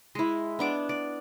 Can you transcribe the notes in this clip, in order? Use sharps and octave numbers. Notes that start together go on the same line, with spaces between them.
G#3 E4
B3 D4 D6
D5